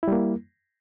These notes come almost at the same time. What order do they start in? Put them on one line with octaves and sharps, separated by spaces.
E4 G3 A#3